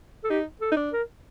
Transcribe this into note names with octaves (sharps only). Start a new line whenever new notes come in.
A4
D#4 G4
A4
D#4
D4
A#4